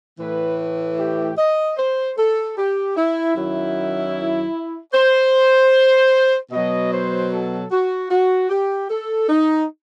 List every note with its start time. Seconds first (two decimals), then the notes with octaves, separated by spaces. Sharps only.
0.19 A2 E3 B4
0.98 G4
1.37 D#5
1.77 C5
2.17 A4
2.57 G4
2.97 E4
3.36 F#2 D#3 F#3 E4
4.94 C5
6.52 B2 D#5
6.57 F#3
6.92 C5
7.32 A4
7.71 F#4
8.11 F#4
8.50 G4
8.90 A4
9.29 D#4